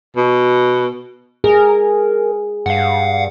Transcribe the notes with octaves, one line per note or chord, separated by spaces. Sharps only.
B2
G#4 A#4
G2 F5 F#5